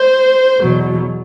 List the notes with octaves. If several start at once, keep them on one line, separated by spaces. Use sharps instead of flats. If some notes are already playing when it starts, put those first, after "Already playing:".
Already playing: C5
E2 B2 F#3